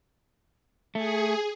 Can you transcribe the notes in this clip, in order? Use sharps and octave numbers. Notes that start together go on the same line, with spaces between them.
A3 G#4